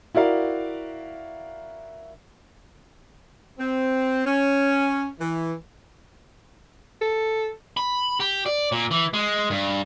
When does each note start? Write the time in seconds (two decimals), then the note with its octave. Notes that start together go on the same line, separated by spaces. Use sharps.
0.15 E4 F#4 A#4 D5 F5
3.58 C4
4.26 C#4
5.20 E3
7.01 A4
7.77 B5
8.20 G4
8.46 D5
8.72 A#2
8.91 E3
9.13 G#3
9.50 G2